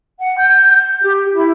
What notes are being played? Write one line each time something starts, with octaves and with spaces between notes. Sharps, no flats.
F#5
G6
G4
E4